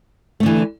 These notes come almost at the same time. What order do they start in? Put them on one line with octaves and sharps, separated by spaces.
A3 D3 E3